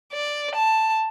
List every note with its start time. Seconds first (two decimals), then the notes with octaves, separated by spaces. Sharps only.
0.13 D5
0.55 A5